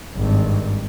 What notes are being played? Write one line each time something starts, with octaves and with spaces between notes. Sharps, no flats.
G#1 G2